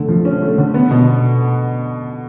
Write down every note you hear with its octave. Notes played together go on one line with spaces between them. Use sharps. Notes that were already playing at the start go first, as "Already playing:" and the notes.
Already playing: D3 A3
F3
C#4
A3
D3
B3
B2